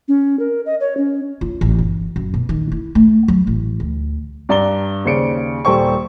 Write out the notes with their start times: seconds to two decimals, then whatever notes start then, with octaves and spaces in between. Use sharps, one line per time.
0.08 C#4
0.39 A#4
0.66 D#5
0.80 C#5
0.97 C#4
1.41 F4
1.61 A1
1.78 G1
2.16 F#2
2.34 B2
2.49 D#3
2.72 E4
2.95 A3
3.28 F#3
3.47 A1
3.80 D2
4.49 G2 D5 A#5 G7
5.05 D#2 C#3 C5 D5 C#7 D7
5.65 D#1 G3 A4 C5 G5 C#6